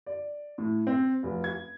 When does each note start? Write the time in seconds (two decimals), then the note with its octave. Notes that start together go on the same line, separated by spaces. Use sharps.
0.06 D5
0.58 A2
0.87 C4
1.23 F1
1.44 G#6